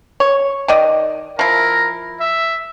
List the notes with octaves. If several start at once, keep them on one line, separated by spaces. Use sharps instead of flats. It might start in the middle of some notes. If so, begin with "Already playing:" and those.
C#5
D#3 D5 D#5
F3 E4 A#4
E5